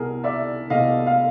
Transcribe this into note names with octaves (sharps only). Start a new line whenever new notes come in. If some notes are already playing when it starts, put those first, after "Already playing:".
Already playing: C2 B2 G#4 A#4
D5 E5
C2 B2 D#5 F5
F5